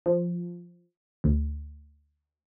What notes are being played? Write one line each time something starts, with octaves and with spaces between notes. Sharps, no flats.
F3
D2